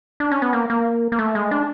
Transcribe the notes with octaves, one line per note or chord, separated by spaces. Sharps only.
D4
C#4
B3
A#3
A#3
A#3
A3
G#3
D4